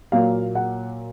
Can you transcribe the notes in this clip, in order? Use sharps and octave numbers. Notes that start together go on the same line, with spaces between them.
A#2 F#3 A#3 F5
F#5